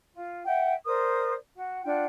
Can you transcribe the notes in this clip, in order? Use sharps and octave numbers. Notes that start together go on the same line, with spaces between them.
F4
E5 F#5 G5
A#4 C5 D5 D#6
F#4 F#5
D4 F4 F#5 G5